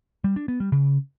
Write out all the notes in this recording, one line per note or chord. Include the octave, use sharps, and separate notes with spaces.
G3
D4
B3
G3
C#3